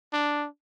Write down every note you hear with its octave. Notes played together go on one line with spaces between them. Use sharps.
D4